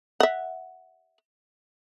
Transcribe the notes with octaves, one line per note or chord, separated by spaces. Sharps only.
E5 F#5